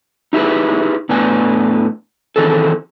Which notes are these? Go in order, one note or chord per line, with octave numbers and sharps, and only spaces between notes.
D#4 E4 G4 G#4 B4
E2 A2 E3 B3 D4 G#5
D#3 E3 C4 G#4 A4